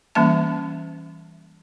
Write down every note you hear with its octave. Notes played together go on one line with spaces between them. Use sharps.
E3 G3 A#3 C#4 E5 A5